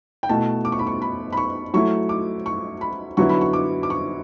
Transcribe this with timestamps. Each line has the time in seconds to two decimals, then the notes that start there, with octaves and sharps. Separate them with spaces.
0.23 G5
0.29 B2 A3 E4 A5
0.65 D6
0.72 C#6
0.79 B5
0.87 C#6
1.02 B5
1.32 B5
1.37 C#6
1.74 F#3 A3 E4 C#6
2.09 D6
2.46 C#6
2.81 B5
3.17 D3 F#3 B3 E4 C#6
3.29 B5
3.41 C#6
3.53 D6
3.83 D6
3.90 C#6